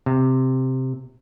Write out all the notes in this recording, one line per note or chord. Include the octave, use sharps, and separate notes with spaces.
C3